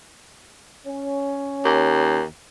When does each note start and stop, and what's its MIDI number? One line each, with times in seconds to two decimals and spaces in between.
0.87 2.20 61
1.65 2.24 39